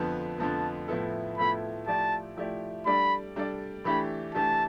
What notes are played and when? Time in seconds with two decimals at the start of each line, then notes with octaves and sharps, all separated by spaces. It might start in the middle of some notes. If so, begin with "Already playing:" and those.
Already playing: F2 D3 F3 B3
0.38 F2 D3 F3 B3 A5
0.88 A2 F3 B3 E4 A4
1.38 A2 F3 B3 E4 A4 B5
1.87 F3 A3 E4 G4 D5 A5
2.36 F3 A3 E4 G4 D5
2.86 G3 D4 A4 D5 B5
3.36 G3 D4 A4 D5
3.85 E3 A3 D4 G4 B5
4.34 E3 A3 D4 G4 A5